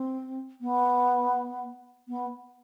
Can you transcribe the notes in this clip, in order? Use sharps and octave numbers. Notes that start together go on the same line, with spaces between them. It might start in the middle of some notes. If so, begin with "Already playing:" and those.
Already playing: C4
B3
B3